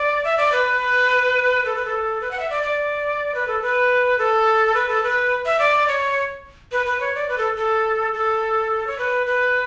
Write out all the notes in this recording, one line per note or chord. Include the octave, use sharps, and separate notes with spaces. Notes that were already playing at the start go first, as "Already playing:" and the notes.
Already playing: D5
E5
D5
B4
A4
B4
A4
B4
F#5
E5
D5
D5
B4
A4
B4
A4
B4
A4
B4
E5
D5
C#5
B4
B4
C#5
D5
B4
A4
A4
A4
C#5
B4
B4